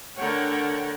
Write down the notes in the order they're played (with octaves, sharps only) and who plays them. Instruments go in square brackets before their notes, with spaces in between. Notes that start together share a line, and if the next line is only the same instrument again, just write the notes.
[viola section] D3 A3 A#4 C#5 F#5 G5